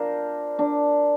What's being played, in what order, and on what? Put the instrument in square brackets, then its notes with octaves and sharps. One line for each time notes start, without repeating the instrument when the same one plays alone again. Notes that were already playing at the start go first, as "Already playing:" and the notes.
Already playing: [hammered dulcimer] D4 F4 A#4 C5
D4